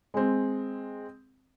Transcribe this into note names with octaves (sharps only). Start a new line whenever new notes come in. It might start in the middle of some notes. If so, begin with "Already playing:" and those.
G#3 C4